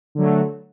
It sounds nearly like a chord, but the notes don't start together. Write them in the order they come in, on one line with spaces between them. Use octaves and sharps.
D3 F#3 A3